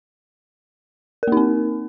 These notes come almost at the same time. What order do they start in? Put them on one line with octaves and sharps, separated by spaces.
A#4 A#3 D#4 C4